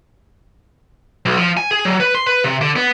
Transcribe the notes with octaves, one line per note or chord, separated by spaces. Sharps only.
B1
F3
G#5
G#4
F#3
B4
C6
B4
C3
D3
B3